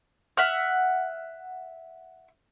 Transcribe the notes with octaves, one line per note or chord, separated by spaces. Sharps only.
E5 F#5 F6